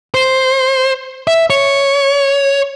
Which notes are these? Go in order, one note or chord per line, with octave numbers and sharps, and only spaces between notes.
C5
E5
C#5